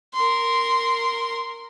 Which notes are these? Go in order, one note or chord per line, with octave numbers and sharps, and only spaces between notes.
A#4 C6